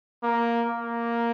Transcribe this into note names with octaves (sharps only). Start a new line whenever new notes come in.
A#3
A#3